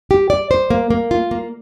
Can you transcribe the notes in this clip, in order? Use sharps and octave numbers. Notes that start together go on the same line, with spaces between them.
G4
D5
C5
A#3
A#3
F4
A#3